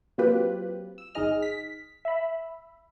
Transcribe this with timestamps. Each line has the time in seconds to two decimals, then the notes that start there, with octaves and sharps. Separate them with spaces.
0.18 F#3 A#3 C4 F4 G4 B4
0.98 E6
1.15 G1 D#4 G#4 D#5 F6
1.42 B6
2.05 E5 B5